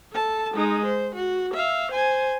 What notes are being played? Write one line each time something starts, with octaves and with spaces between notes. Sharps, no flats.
A4 A5
G#3 D#4
C5
F#4
E5 F5
C5 G#5